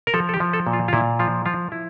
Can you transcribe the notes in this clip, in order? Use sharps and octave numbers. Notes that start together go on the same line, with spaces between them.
A#4
F3 A4
A4
G4
F3
A4
A#2
F4
F4
A#2 E4
F3 F4
F3 F4
F3 E4